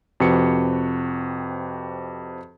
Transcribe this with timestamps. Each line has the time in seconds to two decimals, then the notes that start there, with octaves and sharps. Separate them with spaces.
0.20 F2 C3 F#4 B4 C#7